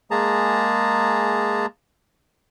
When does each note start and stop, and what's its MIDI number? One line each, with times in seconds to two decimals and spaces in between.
0.11 1.66 56
0.11 1.66 58
0.11 1.66 68
0.11 1.66 81
0.11 1.66 82